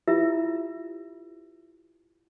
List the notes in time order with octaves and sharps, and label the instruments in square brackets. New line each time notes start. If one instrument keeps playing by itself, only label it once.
[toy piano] E4 F4 G4 B4 E5